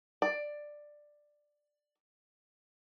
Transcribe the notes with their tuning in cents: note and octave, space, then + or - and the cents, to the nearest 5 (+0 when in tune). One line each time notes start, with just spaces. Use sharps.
D5 +10